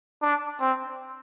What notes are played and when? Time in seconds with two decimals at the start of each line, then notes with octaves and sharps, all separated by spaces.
0.22 D4
0.60 C4